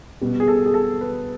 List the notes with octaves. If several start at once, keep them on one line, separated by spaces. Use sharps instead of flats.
B2 G3 B3
G#4
A4
G#4
A4
B4